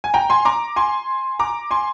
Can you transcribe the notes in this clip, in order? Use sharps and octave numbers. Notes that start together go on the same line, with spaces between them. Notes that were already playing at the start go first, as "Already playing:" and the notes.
G#5
G5 A#5
G#5 C6
A#5 D6
G#5 C6
A#5 D6
G#5 C6